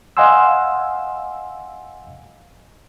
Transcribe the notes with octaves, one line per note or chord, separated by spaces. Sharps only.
D#5 F5 F#5 G#5 C6 E6